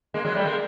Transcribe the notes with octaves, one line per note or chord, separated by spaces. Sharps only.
G#3 A#3
F#3 G#3
G3 A3
G#3 A#3